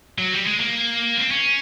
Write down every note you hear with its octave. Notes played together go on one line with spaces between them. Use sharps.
F#3
G3
G#3
A#3
C4
C#4